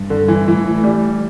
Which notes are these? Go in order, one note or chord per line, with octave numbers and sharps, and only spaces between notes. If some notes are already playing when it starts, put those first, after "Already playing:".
Already playing: G2
D3
E3
A2 E3
G3